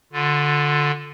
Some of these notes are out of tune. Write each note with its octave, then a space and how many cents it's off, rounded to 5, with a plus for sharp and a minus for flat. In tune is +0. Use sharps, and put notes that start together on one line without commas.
D3 +0 F4 +25